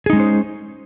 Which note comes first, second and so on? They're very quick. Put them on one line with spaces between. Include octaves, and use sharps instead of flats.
G#4 D#4 G#3 C#4 C5